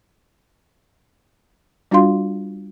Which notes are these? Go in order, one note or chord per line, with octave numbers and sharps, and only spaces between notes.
G3 D4 F4 F#4 F5 C6